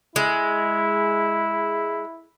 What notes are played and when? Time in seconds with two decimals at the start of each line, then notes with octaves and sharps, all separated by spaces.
0.16 G#3 E4